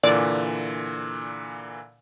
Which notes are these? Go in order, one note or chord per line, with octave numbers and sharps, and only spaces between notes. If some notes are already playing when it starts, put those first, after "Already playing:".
A#2 D3 E3 D5